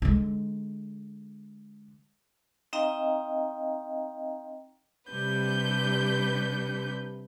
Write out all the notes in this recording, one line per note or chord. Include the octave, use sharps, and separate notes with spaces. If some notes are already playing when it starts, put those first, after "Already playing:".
D3 G#3
C4 D#4 D#5 F5 G5 A#5
C3 G3 D4 B4 G6